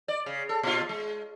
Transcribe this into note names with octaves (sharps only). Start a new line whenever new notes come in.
D5
C#3
A4
A#2 F4
G#3